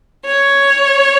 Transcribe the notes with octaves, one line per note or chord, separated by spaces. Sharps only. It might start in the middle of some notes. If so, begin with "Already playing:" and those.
C#5